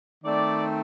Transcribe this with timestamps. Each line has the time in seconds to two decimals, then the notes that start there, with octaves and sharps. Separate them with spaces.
0.24 D#3 A3 C4 D5